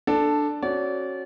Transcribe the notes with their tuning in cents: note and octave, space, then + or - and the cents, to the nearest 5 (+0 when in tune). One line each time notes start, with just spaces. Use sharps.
D4 +10 A4 +0
C#4 -30 F#4 +0 D5 -30